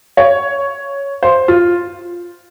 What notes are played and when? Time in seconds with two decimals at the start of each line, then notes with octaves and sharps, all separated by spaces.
0.17 C#5
1.23 C5
1.48 F4